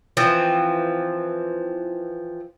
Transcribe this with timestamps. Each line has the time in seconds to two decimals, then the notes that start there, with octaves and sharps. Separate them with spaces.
0.17 E3 F3 C4